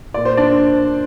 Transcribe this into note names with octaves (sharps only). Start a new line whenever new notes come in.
A#2 D5
C5
D4 D5